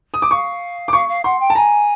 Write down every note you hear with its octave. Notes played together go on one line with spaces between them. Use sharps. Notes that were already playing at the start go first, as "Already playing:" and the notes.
D#6
D6
F5 C#6
D6
F5 C#6
F5
F#5 C6
G5
A5
G#5 A#5